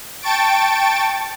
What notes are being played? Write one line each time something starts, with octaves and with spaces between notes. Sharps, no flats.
G5 A5 C#6 A6 D7